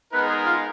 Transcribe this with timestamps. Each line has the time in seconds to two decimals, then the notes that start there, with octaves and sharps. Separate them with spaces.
0.12 G#3 B3 D#4 A#4 B4
0.29 G#4
0.46 F4